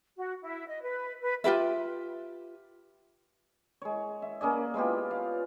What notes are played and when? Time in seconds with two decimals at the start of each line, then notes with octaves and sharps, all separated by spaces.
0.17 F#4
0.42 E4
0.67 D#5
0.81 B4
1.22 B4
1.44 F4 G4 B4 E5
3.82 G#3 C#5
4.22 E5
4.41 A#3 C#4 G#4 D5
4.74 G#3 B3 F4 G4
5.11 F5